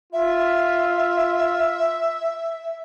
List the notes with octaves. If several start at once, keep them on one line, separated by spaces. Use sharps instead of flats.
F4 E5